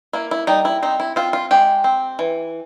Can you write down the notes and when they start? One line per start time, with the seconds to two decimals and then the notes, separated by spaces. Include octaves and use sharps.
0.13 A#3 E4
0.31 E4
0.47 G3 D#4
0.65 E4
0.83 C4 D#4
1.00 E4
1.16 C4 F4
1.33 F4
1.51 G#3 G4
1.84 C4
2.19 E3